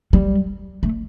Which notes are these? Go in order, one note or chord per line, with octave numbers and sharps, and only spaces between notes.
G3
A3